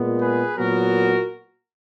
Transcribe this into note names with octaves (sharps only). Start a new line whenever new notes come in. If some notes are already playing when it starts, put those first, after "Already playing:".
Already playing: A#2 G#3 B3
G#4 B4
A#2 F#3 B3 F#4 A#4